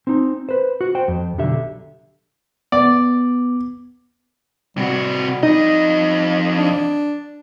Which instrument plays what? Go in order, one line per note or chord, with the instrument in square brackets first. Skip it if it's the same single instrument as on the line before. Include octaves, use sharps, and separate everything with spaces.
[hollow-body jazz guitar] C4 D#4
B4 C5
F#4
C5 G5
F2
B1 D3 G4 E5
[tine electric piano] B3 D6 [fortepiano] D5
[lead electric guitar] C3 F#4 [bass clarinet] G3
[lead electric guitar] F2 D#5 [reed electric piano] D#4
[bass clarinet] D4